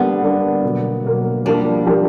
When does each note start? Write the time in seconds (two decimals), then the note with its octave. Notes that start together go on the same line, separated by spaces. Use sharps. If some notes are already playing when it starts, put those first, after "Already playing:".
Already playing: D3 G3 A#3 B3 D4
0.22 D3 G3 A#3 D4
0.63 B2 F#3 A#3
1.04 B2 F#3 A#3
1.45 F3 G3 A#3 D4 G4
1.86 F3 A#3 D4 G4